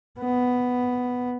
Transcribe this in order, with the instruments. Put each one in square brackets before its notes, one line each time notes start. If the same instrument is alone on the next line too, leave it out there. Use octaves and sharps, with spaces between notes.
[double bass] B3